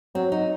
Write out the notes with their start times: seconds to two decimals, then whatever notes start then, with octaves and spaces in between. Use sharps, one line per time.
0.15 F#3 C4
0.32 D#4